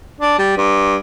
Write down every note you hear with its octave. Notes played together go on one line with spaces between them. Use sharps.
D4
G3
G2